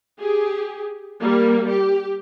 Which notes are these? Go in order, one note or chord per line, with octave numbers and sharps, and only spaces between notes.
G4 G#4
G3 A#3
G4